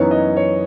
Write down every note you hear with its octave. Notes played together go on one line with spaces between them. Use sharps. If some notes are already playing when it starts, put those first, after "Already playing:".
Already playing: F#2 E3 B3 D#4 C#5
D#5
C#5